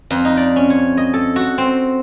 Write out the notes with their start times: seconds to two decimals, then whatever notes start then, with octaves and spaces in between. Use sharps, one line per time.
0.11 F2
0.25 D#4
0.37 D5
0.56 C#4
0.70 C#5
0.97 D#5
1.14 A4
1.36 F#4
1.58 C4